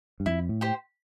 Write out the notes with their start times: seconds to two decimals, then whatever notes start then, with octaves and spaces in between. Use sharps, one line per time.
0.20 G2
0.26 F2 E4
0.49 A2
0.61 G4 C5 G5